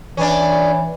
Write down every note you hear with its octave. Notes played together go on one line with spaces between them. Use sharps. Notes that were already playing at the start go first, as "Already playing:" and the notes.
E3 C#4 D4